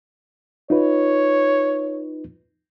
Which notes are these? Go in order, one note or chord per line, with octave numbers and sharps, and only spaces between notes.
D#4 F4 B4 C#5